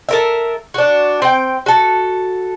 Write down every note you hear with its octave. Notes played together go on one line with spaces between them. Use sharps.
A4 A#4 E5
D4 F#4
C4 G5
F#4 A4